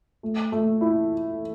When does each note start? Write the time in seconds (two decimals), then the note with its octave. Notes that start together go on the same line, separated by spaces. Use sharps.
0.23 A3
0.52 A3
0.81 E4